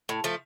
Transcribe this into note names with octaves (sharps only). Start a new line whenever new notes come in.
A2
F3 A3